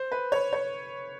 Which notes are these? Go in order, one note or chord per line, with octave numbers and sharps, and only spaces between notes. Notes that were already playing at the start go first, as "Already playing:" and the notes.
Already playing: C5
B4
C#5
C#5